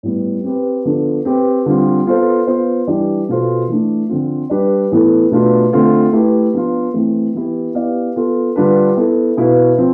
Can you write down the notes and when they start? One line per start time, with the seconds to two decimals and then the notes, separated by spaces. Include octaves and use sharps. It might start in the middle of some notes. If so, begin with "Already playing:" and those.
0.03 A2 G3 B3
0.44 C4 G4 B4
0.85 D3 F3 B3 D4 A4
1.25 C4 G4 B4
1.66 D3 G3 C4 F4
2.06 B3 F4 A4 C5 F5
2.47 B3 F4 C5
2.87 E3 G3 D4 G4 D5
3.29 B2 B3 F4 A4 C5
3.68 E3 A3 D4
4.09 D3 F3 C4 F4
4.50 G3 D4 G4 B4 D5
4.91 A2 E3 B3 E4 A4
5.31 B2 A3 D4 F4 B4
5.72 D3 A3 C4 F4 A4
6.13 A3 E4 G4 B4
6.54 F3 B3 D4 F4
6.94 E3 A3 C4
7.34 E3 B3 E4 G4
7.74 B3 E4 G4 D5 F5
8.16 B3 F4 A4
8.56 D3 G3 D4 F4 B4
8.97 B3 E4 A4
9.37 B2 B3 E4 B4 F5
9.78 F3 C4